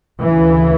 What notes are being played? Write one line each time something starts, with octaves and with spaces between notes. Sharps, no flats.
D2 C#3 E3